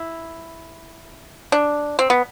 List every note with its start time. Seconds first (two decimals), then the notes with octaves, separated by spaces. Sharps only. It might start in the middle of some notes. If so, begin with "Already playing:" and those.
Already playing: E4
1.52 D4
1.99 C4
2.10 B3